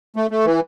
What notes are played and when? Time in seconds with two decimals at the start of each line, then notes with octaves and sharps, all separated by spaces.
0.16 A3
0.31 A3
0.45 E3